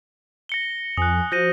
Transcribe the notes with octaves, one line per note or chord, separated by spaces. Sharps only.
A#6 C#7 G7
F2 G#5 D#6 F#6
F3 F#4 C5 G6 A#6 D#7